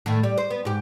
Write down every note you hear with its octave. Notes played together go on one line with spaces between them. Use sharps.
A2 D#3 A3
G3
C5
B3
G#2 G4